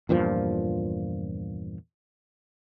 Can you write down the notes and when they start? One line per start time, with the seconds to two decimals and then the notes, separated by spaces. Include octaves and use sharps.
0.09 E2 G2 A#2 F3